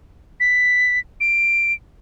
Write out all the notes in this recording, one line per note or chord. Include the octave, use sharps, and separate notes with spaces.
B6
D7